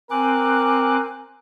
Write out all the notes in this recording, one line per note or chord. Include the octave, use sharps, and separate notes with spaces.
C4 A#4 G#5 D6 F#6